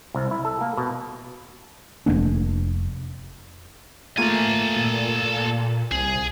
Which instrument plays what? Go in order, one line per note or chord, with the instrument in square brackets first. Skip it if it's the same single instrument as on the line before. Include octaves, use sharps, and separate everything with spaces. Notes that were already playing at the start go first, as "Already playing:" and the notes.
[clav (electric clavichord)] C2
E4
A4
A#3
B2
[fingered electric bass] F1 G2 A#3 D4
[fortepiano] A3 A#3 F4 [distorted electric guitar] A4 G#5
[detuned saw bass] A#2
[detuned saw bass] C2 [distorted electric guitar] G#4